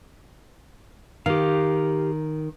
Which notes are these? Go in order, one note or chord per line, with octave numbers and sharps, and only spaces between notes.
D#3 G4 F5